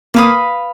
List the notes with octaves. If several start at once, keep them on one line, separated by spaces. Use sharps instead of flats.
A#3 B4 F5 B5 D#6